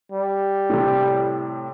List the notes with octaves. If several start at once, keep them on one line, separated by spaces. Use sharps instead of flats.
G3
A2 C3